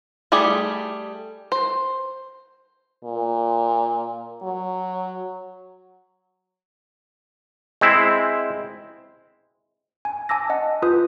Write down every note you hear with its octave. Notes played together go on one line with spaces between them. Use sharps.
G3 A3 G4 G#4
C5
A#2
F#3
G#3 C4 E4 E5
G#5
G#5 A5 D6 E6 A#6
D#5 F#5 A5
F4 B4 D#6 G6